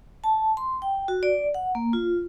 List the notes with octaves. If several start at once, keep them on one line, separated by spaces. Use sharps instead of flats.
A5
C6
G5
F#4
D5
F#5
A#3
F4